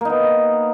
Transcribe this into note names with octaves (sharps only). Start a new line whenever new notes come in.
A#3 B3 D#4